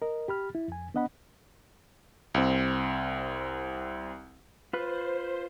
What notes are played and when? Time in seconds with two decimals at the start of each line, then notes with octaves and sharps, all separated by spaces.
0.02 A#4 D#5
0.28 G4 B5 F6
0.55 E4
0.68 F2 G#5
0.94 B3 D4 D#5 F#5 B5
2.34 C2 C4
4.73 F4 B4 C5